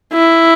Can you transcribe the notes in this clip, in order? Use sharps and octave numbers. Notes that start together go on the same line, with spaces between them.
E4